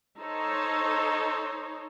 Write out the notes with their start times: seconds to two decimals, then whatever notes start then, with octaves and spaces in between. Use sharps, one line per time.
0.18 D#4 A4 C5 C#5